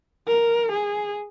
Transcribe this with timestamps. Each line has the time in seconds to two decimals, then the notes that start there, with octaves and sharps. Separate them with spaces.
0.28 A#4
0.72 G#4